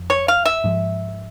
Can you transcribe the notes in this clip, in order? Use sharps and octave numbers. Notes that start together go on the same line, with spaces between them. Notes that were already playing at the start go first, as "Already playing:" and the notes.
Already playing: F2
C#5
F5
E5
G#2 F3 G#3